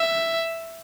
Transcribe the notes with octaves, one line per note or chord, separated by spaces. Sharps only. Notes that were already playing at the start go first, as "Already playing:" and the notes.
Already playing: E5